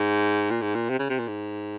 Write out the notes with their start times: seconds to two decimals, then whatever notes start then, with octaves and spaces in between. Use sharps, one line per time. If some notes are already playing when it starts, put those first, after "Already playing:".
Already playing: G#2
0.50 A#2
0.62 G#2
0.75 A#2
0.89 C3
0.99 C#3
1.09 C3
1.19 A#2
1.28 G#2